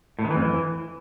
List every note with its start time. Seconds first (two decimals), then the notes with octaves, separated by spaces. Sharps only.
0.19 A2
0.24 D#3
0.30 E3
0.36 F2
0.42 E3